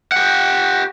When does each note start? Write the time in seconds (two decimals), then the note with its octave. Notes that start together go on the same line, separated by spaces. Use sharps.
0.12 G4 F#5